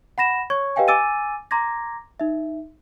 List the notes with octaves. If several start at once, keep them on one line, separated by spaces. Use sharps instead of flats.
F#5 B5 A#6 E7
C#5 C#6 G#6
G4 B4 D#5 F5 G5 G#5
G#5 D6 E6 A6 D#7
A#5 C6 D6 G#6 A#6
D#4 E5